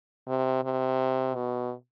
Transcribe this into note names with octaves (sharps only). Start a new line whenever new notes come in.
C3
C3
B2